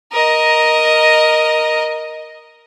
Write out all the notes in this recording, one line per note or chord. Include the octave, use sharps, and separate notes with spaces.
A#4 D#5